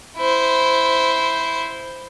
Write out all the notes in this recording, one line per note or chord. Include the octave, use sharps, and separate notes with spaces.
E4 C5